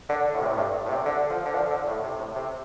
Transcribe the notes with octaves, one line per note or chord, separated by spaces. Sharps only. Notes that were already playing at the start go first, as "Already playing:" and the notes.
D3
A2
C3
A2
G2
A2
C3
D3
F3
D3
F3
D3
A2
C3
A2
C3